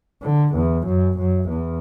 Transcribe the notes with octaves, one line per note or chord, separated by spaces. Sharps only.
D3
E2
F#2
F#2
E2